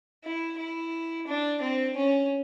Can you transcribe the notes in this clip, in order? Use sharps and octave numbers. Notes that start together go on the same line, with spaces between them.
E4
E4
D4
C4
C#4